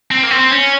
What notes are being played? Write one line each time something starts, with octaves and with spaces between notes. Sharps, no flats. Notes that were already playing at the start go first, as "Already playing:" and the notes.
C4
A#3
C4
C#4